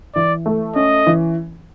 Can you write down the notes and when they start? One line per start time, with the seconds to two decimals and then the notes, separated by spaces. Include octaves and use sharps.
0.15 E3 D5
0.46 A3
0.76 C#4 D#5
1.06 E3